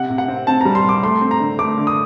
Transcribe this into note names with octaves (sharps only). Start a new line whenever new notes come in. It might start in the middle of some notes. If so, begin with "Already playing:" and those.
Already playing: C3 F#5
C3
F#5
C4
C4 A5
G3 A#5
C6
C3 D6
A3 C6
C4
A#5
D3
A3 D6
D3
D#6